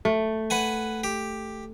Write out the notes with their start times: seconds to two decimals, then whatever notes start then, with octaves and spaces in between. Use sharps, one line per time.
0.05 A3
0.50 B4 F#5 G#5
1.04 G4